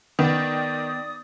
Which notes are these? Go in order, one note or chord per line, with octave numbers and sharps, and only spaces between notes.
D#3 B3 D5 D#6